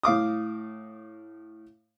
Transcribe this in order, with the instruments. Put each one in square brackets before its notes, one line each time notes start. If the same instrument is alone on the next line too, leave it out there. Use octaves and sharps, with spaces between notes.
[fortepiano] A2 F5 D6 D#6